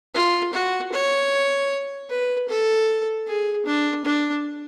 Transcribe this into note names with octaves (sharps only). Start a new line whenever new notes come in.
F4
F#4
C#5
B4
A4
G#4
D4
D4